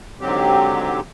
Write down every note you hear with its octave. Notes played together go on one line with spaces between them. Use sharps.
G#2 D3 F#3 C4 G4